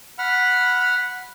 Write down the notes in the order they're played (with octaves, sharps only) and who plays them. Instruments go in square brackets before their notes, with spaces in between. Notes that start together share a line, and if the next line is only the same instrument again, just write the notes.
[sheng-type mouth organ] F#5 B5 F6